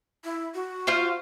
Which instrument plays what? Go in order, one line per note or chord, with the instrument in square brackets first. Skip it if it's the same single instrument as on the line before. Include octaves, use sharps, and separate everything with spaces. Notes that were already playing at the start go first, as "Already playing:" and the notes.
[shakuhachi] E4
F#4
[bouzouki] F4 C5 F5